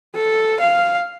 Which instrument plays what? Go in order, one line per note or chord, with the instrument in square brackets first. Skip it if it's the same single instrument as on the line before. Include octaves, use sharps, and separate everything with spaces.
[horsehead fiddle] A4
F5